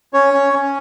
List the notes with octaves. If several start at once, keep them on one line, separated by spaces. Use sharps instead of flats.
C#4 C#5
C#4
C#4